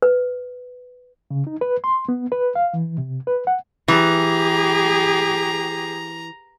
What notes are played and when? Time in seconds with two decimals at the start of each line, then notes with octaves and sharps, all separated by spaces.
0.02 B4
1.31 C#3
1.47 D#4
1.61 B4
1.84 C6
2.09 B3
2.32 B4
2.55 F5
2.74 E3
2.98 C3
3.27 B4
3.47 F#5
3.88 E3 G4 G#4 A#5